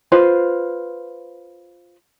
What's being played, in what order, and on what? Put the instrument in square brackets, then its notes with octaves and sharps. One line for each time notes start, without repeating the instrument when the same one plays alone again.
[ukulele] F4 B4 C5